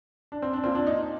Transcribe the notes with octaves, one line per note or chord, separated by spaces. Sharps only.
D4
C4
D4
A#2 C4
D4
D#4